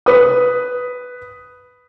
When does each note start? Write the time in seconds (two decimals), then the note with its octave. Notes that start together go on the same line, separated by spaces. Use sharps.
0.06 B4 D#6